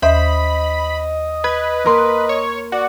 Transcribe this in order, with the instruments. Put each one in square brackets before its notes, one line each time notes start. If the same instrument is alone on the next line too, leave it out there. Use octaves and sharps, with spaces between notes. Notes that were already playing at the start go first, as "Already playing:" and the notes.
[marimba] D#2 E5 [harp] C5 [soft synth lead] D#5 [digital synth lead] B5
[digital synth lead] B4 [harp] G#6
[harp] A#3 A#4 C6
[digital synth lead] C#5
[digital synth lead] F#4 [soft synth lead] D5